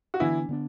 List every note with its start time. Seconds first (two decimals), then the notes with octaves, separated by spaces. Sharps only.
0.14 F#4
0.20 D3 E3 B3 D4 E4
0.49 D3 B3 D4